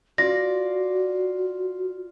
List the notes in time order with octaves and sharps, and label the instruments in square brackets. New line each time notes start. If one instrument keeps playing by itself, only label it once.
[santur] F4 [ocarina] F#4 [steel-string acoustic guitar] D5 [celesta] A#6